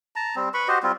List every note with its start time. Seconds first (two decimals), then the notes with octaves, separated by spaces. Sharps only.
0.16 A5 A#5
0.36 G3 C4
0.54 B4 B5 C#6
0.68 F#4 G4 C5 D#5
0.83 G3 C4 F4